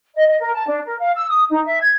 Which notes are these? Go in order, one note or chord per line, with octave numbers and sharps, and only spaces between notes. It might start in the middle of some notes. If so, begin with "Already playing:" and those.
D#5
D#5
A#4
A5
D4
A#4
F5
E6
D#6
D#4
E5
G#6